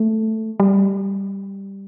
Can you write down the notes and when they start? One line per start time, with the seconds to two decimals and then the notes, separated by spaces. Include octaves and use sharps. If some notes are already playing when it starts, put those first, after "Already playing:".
Already playing: A3
0.60 G3